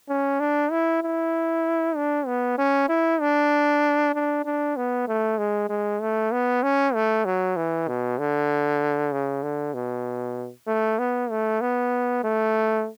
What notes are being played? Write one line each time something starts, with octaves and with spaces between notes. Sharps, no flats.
C#4
D4
E4
E4
D4
B3
C#4
E4
D4
D4
D4
B3
A3
G#3
G#3
A3
B3
C#4
A3
F#3
E3
B2
D3
C#3
D3
B2
A3
B3
A3
B3
A3